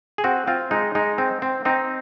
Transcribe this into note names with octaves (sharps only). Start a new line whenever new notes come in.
G#4
C4 F#4
C4 F4
G#3 D#4
G#3 D#4
C4
C4
C4 D#4